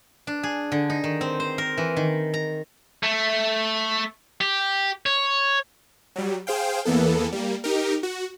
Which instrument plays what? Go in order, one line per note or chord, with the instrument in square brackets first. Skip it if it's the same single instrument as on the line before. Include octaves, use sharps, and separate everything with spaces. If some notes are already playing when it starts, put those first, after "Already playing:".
[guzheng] D4
G#4
D3
D#4
D#3
C4
C5
A#4
E3
D#3
A#5
[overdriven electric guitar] A3
G4
C#5
[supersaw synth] F#3 G3
G#4 C5 F5 G5
E2 E3 A#3 B3 A4
G3 A#3
D#4 G4 A#4
F#4